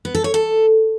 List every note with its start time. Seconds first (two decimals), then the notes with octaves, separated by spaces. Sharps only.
0.05 B3
0.15 A4
0.24 C#5
0.34 A4